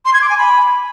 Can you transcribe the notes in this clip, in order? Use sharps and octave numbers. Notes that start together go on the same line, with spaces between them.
C6
G#6
D6
G#5
B5